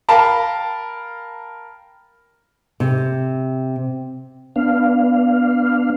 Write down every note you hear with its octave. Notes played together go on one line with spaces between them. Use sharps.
A#4 F5 G5 A5 B5
C3
B3 D4 F5